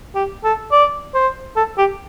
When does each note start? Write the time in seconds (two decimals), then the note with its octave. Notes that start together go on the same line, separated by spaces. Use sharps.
0.15 G4
0.44 A4
0.72 D5
1.15 C5
1.56 A4
1.78 G4